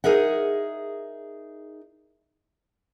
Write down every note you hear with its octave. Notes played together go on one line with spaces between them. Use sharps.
D#4 G#4 A#4 E5 F#5